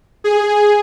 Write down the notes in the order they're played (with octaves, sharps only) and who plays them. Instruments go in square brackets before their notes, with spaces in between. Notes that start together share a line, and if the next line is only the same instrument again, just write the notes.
[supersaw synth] G#4